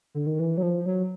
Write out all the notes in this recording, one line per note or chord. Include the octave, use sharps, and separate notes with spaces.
D3
D#3
E3
F#3
F3
F#3